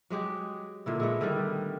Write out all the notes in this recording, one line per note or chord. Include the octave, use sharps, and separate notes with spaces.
F#3 G#3 G4 G#4
A#2 D3 E4
G#3 A3 B3
D3 D#3 G3